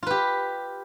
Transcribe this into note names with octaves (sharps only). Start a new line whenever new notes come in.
F4 G4 B4